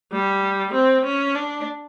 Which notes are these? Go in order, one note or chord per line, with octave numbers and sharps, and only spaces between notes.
G3
C4
C#4
D4